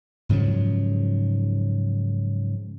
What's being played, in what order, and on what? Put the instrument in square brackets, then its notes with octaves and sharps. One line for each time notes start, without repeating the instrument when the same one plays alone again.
[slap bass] G#2 C#3 F3 F#3